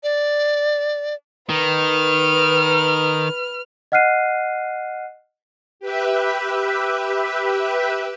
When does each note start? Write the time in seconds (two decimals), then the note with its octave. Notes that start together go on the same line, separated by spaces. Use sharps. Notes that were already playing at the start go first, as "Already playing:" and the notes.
0.03 D5
1.49 D#3 B4 F6
3.92 D#5 F#5 F6 F#6 C7 D#7
5.80 G4 B4 E5